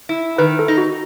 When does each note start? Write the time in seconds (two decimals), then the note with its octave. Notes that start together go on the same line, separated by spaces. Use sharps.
0.09 E4
0.38 D#3 B4
0.59 A4
0.68 D#4
0.78 F#4